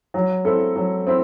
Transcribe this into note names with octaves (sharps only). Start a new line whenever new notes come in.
F#3
C4 E4 A4
F#3
C4 E4